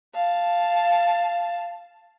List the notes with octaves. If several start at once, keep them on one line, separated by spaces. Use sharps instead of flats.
F5 A5